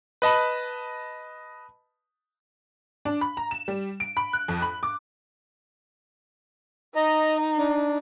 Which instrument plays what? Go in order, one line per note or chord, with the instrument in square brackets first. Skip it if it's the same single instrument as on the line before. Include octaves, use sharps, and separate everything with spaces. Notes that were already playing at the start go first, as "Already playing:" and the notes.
[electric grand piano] B4 D#5 A5 B5
[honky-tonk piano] D4
B5
A#5
E7
G3
D7
B5
F#6
F2
B5
D6
[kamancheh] D#4 [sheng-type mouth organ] D#5 A#5
[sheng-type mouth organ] D4